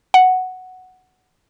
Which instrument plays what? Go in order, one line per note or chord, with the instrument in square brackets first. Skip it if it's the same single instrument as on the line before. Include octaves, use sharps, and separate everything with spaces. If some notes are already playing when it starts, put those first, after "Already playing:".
[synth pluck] F#5